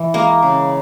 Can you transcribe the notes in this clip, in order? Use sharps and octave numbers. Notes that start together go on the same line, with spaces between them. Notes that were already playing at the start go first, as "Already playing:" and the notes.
Already playing: E3
G#3 A#3 A#4
C#3